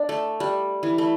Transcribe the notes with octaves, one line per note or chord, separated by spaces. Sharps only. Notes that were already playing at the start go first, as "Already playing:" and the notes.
Already playing: D4
A3
G3
E3
A3